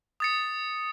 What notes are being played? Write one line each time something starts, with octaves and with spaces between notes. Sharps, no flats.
D#6 A6 C#7